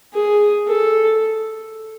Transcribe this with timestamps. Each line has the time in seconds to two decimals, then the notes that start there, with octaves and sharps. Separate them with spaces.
0.14 G#4
0.68 A4